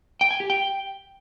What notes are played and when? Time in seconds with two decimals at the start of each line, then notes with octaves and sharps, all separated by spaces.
0.21 G5
0.31 G#5
0.40 G4
0.50 G5